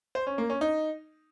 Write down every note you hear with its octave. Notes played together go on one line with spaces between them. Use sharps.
C5
C#4
A#3
C#4
D#4